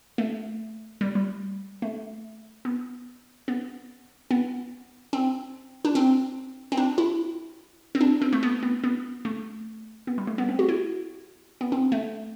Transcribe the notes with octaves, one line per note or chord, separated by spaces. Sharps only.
A3
G3
G3
A3
B3
B3
B3
C4
D4
C4
C4
D4
E4
C4
D4
C4
A3
B3
B3
B3
A3
B3
G3
A3
B3
C4
F#4
E4
B3
C4
A3